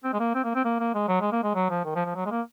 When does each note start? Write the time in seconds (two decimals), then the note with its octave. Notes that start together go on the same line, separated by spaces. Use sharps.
0.04 C4
0.13 G#3
0.20 A#3
0.35 C4
0.44 A#3
0.55 C4
0.65 A#3
0.80 A#3
0.94 G#3
1.08 F#3
1.21 G#3
1.32 A#3
1.43 G#3
1.55 F#3
1.70 F3
1.85 D#3
1.95 F3
2.06 F3
2.16 F#3
2.26 G#3
2.31 A#3